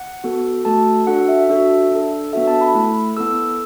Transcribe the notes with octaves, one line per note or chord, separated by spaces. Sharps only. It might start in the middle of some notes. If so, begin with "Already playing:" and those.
Already playing: F#5
B3 F#4 A4
A3 F#4 A4 A5
D4 F#4 A4 F#5
E5
D4 F#4 A4 E5
D4 A4
B3 D4 F#4 A4 E5
A5
B5
A3 E4 A4
B3 E4 A4 E6